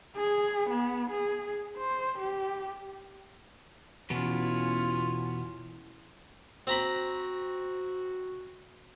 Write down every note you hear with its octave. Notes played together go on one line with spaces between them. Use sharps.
G#4
B3
G#4
C5
G4
E2 B2 B3 C#4 E4 F4
C4 F#4 A#5 B5